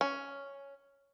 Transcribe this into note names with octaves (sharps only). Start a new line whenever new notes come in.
C#4